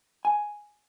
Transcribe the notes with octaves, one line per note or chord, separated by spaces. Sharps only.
G#5